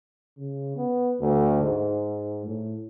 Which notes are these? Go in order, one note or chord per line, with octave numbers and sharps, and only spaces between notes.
C#3
B3
D2
G#2
A2